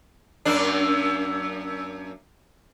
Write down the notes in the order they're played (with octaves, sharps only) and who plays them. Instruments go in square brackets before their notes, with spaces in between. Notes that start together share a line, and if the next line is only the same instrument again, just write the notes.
[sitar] F#2 A#3 D4